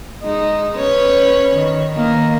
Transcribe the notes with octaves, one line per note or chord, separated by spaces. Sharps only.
G#3 D#4
C#4 B4 C#5
D#3
D#3 A#3